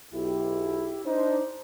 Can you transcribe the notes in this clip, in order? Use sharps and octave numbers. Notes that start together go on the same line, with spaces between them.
B1 E4 G4
D4 D#4 C5